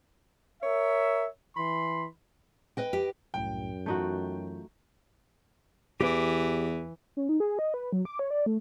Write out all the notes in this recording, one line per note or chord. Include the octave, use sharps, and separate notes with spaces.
A#4 C#5 E5
E3 B5 C6
B4 D#5 G5
G4
C2 F#2 A2 G5
E3 A3 D#4 F4 F#4 G6
E2 E3 G4 D6
C#4
D#4
G#4
D#5
B4
F#3
D6
C#5
D5
A3